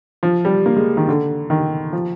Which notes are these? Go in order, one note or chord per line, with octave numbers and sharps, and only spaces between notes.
F3
G3
A#3
G#3
D#3
D3
D#3
F3